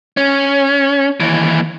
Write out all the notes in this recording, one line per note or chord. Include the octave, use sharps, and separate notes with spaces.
C#4
D#2 E3